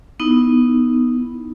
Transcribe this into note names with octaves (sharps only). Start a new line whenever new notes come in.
B3 D#4 E4